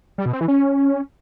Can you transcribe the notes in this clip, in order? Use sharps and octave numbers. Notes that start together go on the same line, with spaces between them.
G3
B2
C4
E3
C#4